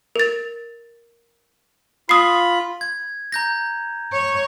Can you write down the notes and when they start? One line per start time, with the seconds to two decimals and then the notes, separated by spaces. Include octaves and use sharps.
0.16 A#4 A6
2.09 F4 B5 D#6 C7
2.81 G#6
3.32 A#5 G6 A#6
4.13 C#5